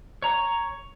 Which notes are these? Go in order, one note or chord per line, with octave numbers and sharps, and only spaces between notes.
C#5 A#5